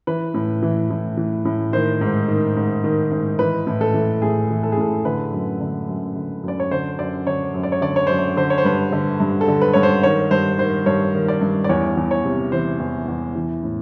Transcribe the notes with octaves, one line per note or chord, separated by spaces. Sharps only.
E3 B4
A2
E3
A2
E3
A2
D#3 C5
G#2
D#3
G#2
D#3
G#2
E3 B4
A2
A4
E3
A2 G#4
E3
A4
G#4
A2 A4
D3 B4
F#2
D3
F#2
D3
F#2 D5
C#5
D3 C5
F#2 D5
D3 C#5
F#2
D5
C#5
D3 D5
C#5
F#2 C5
C#5
D3 C5
C#5
C5
G2 B4
D3
G2
A4
D3
B4
G2 C#5
C5
D#3 C#5
G2 C5
D#3 C5
G2 C#5
D#3
D5
G2
D5
E2 C#5
E2
C#5
C3
E3 C5
E2
E2
E3
A2